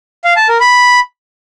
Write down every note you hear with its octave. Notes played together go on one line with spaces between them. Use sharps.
F5
A5
A#4
B5